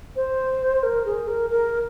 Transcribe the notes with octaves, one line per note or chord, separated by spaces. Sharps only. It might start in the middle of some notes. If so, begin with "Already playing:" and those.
C5
A#4
G#4
A#4
A#4